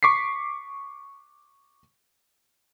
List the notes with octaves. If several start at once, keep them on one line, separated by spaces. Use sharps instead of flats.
C#6 D6 B6 C7